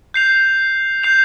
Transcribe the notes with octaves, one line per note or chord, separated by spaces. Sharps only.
G6 C7 F7
G6 C7 F7